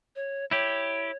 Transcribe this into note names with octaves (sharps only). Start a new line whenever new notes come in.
C#5
E4 G4 C#5